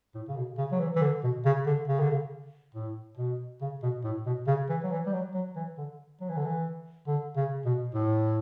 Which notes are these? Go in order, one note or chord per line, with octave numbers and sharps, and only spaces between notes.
A2
C#3
B2
C#3
F#3
E3
E3
D3
B2
C#3
D3
C#3
D3
C#3
A2
B2
C#3
B2
A2
B2
C#3
E3
F#3
E3
G3
F#3
F#3
E3
D3
F#3
E3
D3
E3
D3
C#3
B2
A2